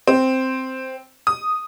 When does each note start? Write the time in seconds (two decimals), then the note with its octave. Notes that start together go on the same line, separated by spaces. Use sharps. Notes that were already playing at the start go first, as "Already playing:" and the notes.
0.07 C4
1.27 D#6